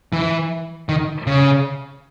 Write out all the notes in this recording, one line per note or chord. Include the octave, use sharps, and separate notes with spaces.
E3
D#3
C#3